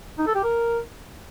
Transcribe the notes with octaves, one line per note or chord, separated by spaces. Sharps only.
D#4
A4
G4
A#4